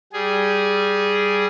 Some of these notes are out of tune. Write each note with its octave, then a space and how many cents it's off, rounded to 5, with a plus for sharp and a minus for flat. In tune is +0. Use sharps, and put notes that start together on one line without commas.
G3 -10 G#4 +0